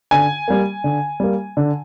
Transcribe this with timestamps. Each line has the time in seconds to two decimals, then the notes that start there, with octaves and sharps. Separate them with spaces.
0.11 D3 G#5
0.48 G3 A#3
0.84 D3
1.20 G3 A#3
1.57 D3